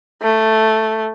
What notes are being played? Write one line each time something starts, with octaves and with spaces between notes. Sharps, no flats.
A3